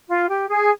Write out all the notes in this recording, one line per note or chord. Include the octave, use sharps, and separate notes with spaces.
F4
G4
G#4